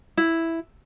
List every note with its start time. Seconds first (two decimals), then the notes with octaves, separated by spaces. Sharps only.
0.17 E4